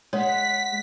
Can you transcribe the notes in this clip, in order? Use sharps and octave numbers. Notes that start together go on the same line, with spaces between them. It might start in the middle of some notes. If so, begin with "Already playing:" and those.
G#3 C#5 F#5 B6